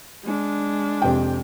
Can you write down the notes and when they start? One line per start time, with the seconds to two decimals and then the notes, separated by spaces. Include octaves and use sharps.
0.24 G#3 D4
1.02 F2 C3 G5